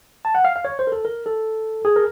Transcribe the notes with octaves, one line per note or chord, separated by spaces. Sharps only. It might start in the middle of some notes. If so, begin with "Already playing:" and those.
A5
F#5
F5
F5
C#5
C5
A#4
A4
A#4
A4
G#4
A#4